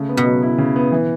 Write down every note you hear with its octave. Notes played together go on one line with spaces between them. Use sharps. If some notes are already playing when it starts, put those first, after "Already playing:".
Already playing: C#3 A3
B3
B2
F#3
E4
C#3
B3
E3